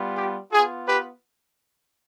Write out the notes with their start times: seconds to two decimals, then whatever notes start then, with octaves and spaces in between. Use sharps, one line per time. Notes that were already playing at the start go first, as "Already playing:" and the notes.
Already playing: G3 B3 F4
0.17 G4
0.52 B3 F4 G#4
0.87 G4 B4